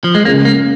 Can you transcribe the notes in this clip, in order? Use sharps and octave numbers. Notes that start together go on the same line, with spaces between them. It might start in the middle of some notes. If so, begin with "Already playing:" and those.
F3
G#3
C#3 G#3 A#3 C#4
A#3